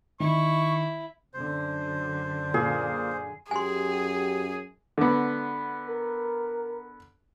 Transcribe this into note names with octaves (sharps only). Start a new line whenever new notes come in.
D#3 E4 C#6
F#2 D3 C5
A#2 G#4
F#2 G4 G#4 G#5 C6
D3 B3
A#4